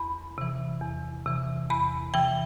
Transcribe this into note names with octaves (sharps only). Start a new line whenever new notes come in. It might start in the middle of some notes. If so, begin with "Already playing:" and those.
Already playing: E2 B5
C3 E3
E2
C3 E3
E2 B5
C3 E3 G5